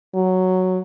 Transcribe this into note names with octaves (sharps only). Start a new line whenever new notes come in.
F#3